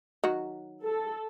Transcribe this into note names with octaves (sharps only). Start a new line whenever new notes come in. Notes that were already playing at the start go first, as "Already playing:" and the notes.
D#3 F#3 F#4
A4